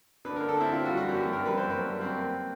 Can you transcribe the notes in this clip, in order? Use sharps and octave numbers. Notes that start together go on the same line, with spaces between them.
D3 B4
A#4
D3
A4
C4 E4
C4 F4
F#4
G3
F#4
F#2 G4
F#2
A#4
G3
B4
F#2 C5
F#2 B4
G3
C4
A#3